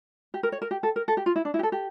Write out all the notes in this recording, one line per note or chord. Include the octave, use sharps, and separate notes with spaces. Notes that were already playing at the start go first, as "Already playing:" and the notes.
G4
A#4
C#5
A#4
G4
A4
A#4
A4
G4
F4
E4
D4
E4
G4
A4
G4